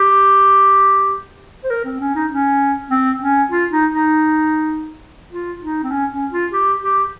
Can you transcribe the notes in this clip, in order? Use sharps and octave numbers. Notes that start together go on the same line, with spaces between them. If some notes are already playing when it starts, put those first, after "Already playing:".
Already playing: G4
C5
A#4
C4
C#4
D#4
C#4
C4
C#4
F4
D#4
D#4
F4
D#4
C4
C#4
C#4
F4
G4
G4